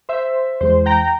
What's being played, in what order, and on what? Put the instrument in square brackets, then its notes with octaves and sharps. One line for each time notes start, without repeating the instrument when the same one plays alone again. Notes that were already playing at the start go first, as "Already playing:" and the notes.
[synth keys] C5 E5
E2 E3 G#3 C5
G5 A#5